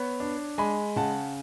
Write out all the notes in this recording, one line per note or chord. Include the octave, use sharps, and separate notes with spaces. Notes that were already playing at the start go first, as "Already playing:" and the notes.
Already playing: B3 C#5
D4
G#3 G#5 B5
C#3 F#5 A5